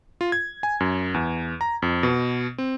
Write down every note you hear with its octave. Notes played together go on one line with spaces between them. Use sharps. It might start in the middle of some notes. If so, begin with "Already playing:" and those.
F4
G#6
G#5
F#2
E2
A#5
F2
B2
C4